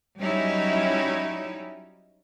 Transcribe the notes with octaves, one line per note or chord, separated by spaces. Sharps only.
F#3 G3 C#4 D#4 E4